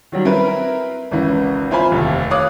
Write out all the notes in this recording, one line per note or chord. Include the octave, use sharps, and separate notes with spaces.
D#3 F#3 G3
C4 E4 A#4 B4
G#1 C#2 E3
C4 E4 F4 C5 G#5 B5
F1 D#2
C#5 F5 D6 D#6 F#6